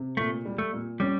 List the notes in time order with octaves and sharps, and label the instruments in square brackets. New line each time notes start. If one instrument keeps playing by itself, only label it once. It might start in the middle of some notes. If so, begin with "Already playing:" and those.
Already playing: [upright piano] C3
[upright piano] A#2 [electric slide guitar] A3
[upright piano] G3
[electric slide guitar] A3
[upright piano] A#2
[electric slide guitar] G3 [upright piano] C#4